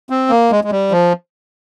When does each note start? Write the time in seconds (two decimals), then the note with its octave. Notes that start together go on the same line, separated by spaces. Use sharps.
0.10 C4
0.30 A#3
0.51 G#3
0.64 G#3
0.71 G3
0.91 F3